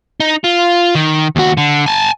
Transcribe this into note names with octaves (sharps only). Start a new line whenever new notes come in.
D#4
F4
D#3
D#2 F#4
D3
G#5 A5